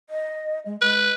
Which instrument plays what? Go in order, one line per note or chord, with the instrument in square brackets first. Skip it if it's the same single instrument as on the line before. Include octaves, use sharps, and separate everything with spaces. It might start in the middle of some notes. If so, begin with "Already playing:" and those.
[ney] D#5
G#3
[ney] G#3 [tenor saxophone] B4